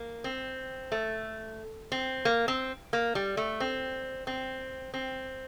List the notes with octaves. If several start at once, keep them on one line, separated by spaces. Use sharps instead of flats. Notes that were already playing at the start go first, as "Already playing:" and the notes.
Already playing: A#3
C4
A3
C4
A#3
C4
A#3
G3
A3
C4
C4
C4